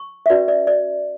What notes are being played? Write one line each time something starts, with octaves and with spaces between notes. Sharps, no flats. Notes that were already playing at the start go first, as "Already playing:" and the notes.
Already playing: C#6
E5
C#4 F#4 B4 D5
D5
D5